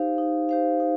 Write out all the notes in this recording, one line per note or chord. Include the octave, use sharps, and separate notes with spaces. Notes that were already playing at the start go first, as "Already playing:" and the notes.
Already playing: D#4 G4 C5 F5
D#4
G4 C5 F5
D#4